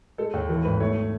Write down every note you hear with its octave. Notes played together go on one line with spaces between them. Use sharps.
G#3 A4
D#2
E3 A4
G#1 B4
A3 C#5